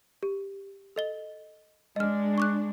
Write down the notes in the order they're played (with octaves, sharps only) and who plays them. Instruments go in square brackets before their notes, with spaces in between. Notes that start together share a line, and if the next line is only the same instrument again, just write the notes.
[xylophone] G4
A4 D#5 G7
[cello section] G#3 D4 [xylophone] D#5 F6
[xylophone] C#6 D6 F#6